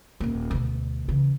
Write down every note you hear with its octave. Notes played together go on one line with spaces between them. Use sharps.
D#1 A#3
D2 B2
C#3 E3